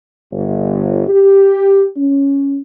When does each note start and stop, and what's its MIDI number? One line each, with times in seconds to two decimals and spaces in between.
0.32 1.03 31
1.09 1.85 67
1.97 2.60 61